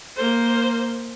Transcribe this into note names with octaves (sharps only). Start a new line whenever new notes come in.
A#3 C5